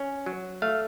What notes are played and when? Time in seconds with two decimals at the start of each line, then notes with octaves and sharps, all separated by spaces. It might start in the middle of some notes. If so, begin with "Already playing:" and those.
Already playing: C#4
0.26 F#3
0.62 A3 F5